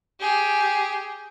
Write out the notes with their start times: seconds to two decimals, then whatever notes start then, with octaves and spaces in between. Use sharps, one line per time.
0.20 G4 G#4